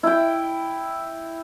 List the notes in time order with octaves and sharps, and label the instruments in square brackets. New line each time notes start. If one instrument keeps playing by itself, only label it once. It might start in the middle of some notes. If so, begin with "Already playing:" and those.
[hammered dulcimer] E4 G5